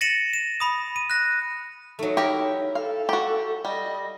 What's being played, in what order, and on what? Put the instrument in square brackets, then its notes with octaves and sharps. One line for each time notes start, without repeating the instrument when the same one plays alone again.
[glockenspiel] A6 A#6 C#7 D#7 E7 F#7
E7
B5 D#6
D#7
F#6 A#6
[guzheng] F#3 A3 [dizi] D#4
[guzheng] E4 A#4 [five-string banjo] G4
[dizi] A4 [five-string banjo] F5
[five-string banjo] F#4 G4
[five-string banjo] G3 [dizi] D#5